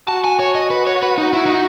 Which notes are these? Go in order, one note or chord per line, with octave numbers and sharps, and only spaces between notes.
F#4 A5
G#5
C#5
D#5
B4
C#5
B4
D#4
E4
D#4